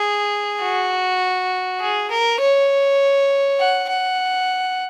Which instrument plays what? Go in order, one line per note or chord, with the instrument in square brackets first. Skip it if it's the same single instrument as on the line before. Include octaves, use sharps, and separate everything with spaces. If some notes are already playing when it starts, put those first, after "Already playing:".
Already playing: [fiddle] G#4
F#4
G#4
A#4
C#5
F#5
F#5